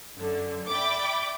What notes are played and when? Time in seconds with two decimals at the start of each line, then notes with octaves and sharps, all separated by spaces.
0.17 F#2 D3
0.70 D5 E5 G5 B5 D6